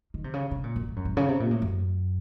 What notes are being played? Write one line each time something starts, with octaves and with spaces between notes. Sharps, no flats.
D#3
C3
C#3
C3
A#2
F#2
A2
F#2
A2
C#3
C3
A#2
A2
F#2